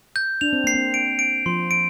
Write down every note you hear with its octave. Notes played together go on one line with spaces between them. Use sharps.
G6
D4 F7
C4
A#3 C7
C4
D7
D7
F3 C6
D7